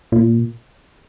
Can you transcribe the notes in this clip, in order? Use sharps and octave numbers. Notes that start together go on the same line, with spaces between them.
A#2